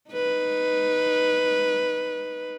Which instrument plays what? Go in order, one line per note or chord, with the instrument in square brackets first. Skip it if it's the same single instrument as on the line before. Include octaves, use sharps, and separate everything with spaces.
[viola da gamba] D#4 B4